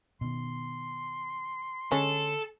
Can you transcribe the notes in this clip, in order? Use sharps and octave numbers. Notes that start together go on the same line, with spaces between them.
B2 D#3 C6
D3 G#3 C#4 A4